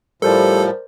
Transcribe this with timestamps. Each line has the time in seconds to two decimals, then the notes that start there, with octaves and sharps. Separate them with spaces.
0.22 A2 F3 G3 A4 A#4 C5 D5